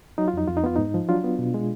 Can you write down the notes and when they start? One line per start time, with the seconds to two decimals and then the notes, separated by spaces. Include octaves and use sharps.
0.18 F#3 D#4
0.28 F4
0.34 F2 D#4
0.47 F2 F4
0.57 D#4
0.64 B3 F4
0.76 G#2 D#4
0.94 F3
1.09 F#3 D4 F4
1.24 B3
1.39 B2
1.54 G#3